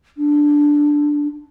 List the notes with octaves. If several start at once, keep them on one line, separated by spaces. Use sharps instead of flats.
D4